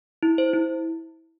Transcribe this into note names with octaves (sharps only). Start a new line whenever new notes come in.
E4
C5
E4